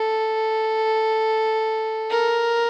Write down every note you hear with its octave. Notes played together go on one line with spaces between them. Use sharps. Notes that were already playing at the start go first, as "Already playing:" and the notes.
Already playing: A4
A#4